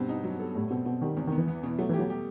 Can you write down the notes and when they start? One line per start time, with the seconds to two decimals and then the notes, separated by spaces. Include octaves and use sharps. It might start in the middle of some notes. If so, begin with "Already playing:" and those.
Already playing: G2 B2 C4
0.09 D#4
0.24 F#3
0.39 A4
0.55 A2 G3
0.71 B2 C4
0.86 B2 C4
1.01 D#3 G3
1.17 E2 C3
1.27 D#3 B3
1.38 E3
1.48 B3
1.63 B2
1.79 F#3 A3
1.89 E3 G4
1.99 F#3
2.10 G3 G4